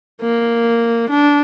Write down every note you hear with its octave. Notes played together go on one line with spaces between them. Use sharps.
A#3
D4